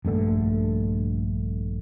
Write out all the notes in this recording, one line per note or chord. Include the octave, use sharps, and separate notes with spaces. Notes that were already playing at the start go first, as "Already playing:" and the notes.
A#1 G2 D3 A3